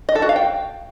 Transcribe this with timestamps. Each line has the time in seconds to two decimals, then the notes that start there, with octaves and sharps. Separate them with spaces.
0.09 D#5
0.15 A4
0.22 F#4
0.29 F5
0.36 G5